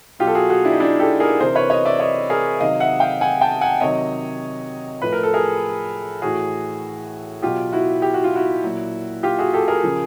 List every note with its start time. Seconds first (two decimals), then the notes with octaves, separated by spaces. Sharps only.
0.19 B2 F#3 F4 G4
0.27 A4
0.35 F#4 G#4
0.50 F#4 G#4
0.64 D4 E4
0.72 D#4
0.79 D4 E4
0.99 G4 A4
1.20 G#4 A#4
1.40 C3 E3 A#4 C5
1.55 B4 C#5
1.70 C#5 D#5
1.85 D5 E5
2.00 C#5 D#5
2.30 G#4 A#4
2.60 C3 D#3 F#3 D#5 F5
2.80 E5 F#5
3.00 F5 G5
3.21 F#5 G#5
3.41 G5 A5
3.61 F#5 G#5
3.81 C3 D#3 F#3 C#5 D#5
5.02 A2 F3 B4
5.13 A#4
5.23 A4
5.34 G#4 A#4
6.22 A2 E3 F#4 G#4
7.42 B2 F#3 F4 G4
7.72 E4 F#4
8.02 G4
8.14 F#4
8.24 F4
8.36 E4 F#4
8.63 A#2 F#3
9.23 F4 G4
9.39 F#4 G#4
9.54 G4 A4
9.68 G#4 A#4
9.84 C#3 F3